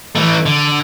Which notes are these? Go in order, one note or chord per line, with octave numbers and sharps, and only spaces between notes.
E3 A3
D3